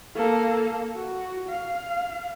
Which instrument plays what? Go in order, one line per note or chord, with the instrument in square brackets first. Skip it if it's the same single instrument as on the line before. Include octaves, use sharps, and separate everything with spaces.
[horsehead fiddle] A#3 A4
F#4
F5